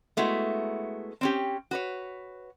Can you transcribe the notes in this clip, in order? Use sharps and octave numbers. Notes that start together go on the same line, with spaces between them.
G#3 A3 B3 E4 F#4
C4 C#4 G4
F#4 B4 C#5